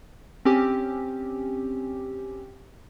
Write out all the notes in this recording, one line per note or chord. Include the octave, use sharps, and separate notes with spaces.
C4 C#4 G4